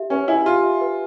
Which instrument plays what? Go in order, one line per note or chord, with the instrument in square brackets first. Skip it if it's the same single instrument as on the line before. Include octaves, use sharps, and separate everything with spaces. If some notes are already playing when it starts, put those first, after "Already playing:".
Already playing: [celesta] G4 E5
[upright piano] C#4 [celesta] B4
[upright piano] E4 [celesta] G#5
[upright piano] F4 [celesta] G4
[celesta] E5
B4